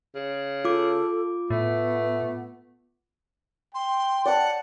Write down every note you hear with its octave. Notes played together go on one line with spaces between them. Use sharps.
C#3
F4 A4 D6
A2 A3 B3
G5 C6
D5 F#5 A5